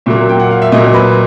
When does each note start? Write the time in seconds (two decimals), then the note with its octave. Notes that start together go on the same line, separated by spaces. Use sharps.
0.06 A#2 F#3 A#3 E5
0.29 G5
0.40 F#5
0.51 F5
0.62 E5
0.72 A#2 F#3 A#3 D#5
0.94 B4